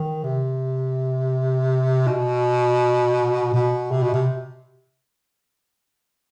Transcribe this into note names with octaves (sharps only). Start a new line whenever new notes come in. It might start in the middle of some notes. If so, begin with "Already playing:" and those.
Already playing: D#3
C3
B2
B2
C3
B2
C3